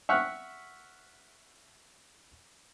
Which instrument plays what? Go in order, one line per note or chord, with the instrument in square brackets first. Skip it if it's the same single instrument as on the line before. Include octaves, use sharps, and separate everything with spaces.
[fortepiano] E5 F#5 C#6 F6 F#6